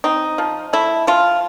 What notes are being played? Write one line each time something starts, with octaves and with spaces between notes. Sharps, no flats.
C4 D#4
F3
A3 E4
F3 F4